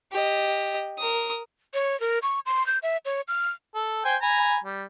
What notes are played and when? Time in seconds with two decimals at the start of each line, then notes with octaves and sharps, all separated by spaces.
0.12 G4 D#5
0.98 A#4 D#6
1.74 C#5
2.00 A#4
2.22 C#6
2.46 C6
2.67 G6
2.83 E5
3.05 C#5
3.28 F6
3.75 A4
4.05 C5 G5 G#5
4.22 G#5 A#5 B5
4.64 G3